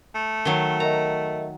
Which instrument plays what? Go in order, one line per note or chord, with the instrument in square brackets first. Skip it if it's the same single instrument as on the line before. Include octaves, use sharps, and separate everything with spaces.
[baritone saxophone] A3
[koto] D#3 F#3 [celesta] G7
[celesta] A#4 D#5 E5 [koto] A#5